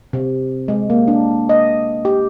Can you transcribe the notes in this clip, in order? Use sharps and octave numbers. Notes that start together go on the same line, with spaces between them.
C3
G#3
A#3
D4
D#5
G4